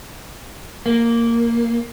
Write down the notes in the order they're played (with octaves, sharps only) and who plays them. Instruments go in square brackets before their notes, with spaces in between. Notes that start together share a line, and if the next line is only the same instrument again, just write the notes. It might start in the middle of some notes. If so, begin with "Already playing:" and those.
[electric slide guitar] A#3